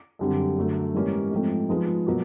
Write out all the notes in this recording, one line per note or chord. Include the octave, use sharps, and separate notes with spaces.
F#2 D3 G3 C4
F#2 D3 F#3 A3
G#2 E3 G3 A#3 C#4
G#2 F3 A3 C4
F3 G#3 B3 D#4
B2 F#3 A#3